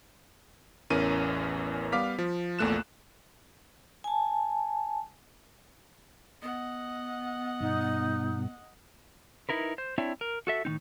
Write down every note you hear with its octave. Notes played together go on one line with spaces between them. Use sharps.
A1 E2 E3 C#4 A#4 D#7
G3 B3 F5 D6 F6 B6
F3
A#1 E2 A#2 A3 F#6 E7
G#5 A5
B3 D#5 F#5
G2 B2 D#4
D#4 E4 A#4 B4
C5
C4 D4 E4 C#5 E5
A#4
F#4 A4 E5
A2 D#3 C4 D#4